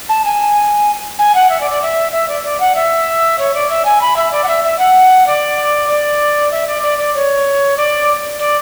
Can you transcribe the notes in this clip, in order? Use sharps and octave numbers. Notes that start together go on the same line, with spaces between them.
A5
G#5
G#5
F#5
E5
D5
D5
E5
E5
D5
D5
F#5
E5
C#5
D5
E5
G#5
B5
E5
D5
F#5
E5
E5
F#5
D5
D5
E5
D5
D5
D5
C#5
D5
D5